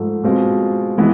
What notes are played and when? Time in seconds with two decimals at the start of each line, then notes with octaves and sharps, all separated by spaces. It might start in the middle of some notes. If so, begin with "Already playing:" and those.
Already playing: G#2 F3 A3
0.24 B2 G#3 C4 F4
0.98 E3 G#3 B3 E4